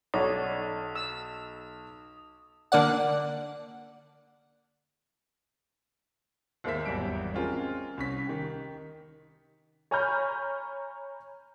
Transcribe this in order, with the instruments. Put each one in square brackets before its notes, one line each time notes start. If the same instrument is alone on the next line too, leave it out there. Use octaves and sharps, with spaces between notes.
[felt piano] B1 [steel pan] C#5 D5 F#5 [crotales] D#6
[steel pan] E6
[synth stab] D3 A#3 D5 F#5
[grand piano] D#2 G#3 A#3 C5 E5 B6
G#1 E2 F#3 G3 D7
G#3 C4 C#4 F4 G#4 A#4
C2 C#4 B6
D#3 G4
[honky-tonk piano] C#5 G#5 A#5 B5 F6 G6